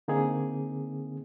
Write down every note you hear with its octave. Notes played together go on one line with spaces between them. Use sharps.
D3 A#3 C4 D#4 G#4